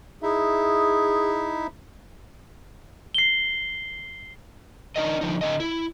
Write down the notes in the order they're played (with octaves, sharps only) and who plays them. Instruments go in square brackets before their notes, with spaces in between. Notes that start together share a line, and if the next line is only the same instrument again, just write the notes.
[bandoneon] D#4 E4 E5 [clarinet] G#4
[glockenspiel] C7 G7
[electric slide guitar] D4 D#4 A#4 D#5
D3 F3 D#4
D3 A4 D#5
E4